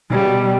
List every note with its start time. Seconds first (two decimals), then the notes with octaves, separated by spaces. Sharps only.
0.10 B2 G3
0.18 C#3
0.25 B2